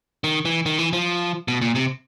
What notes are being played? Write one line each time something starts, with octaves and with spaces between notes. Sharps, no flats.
D#3
E3
D#3
E3
F3
B2
A#2
C3